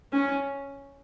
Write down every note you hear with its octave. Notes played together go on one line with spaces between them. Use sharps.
C#4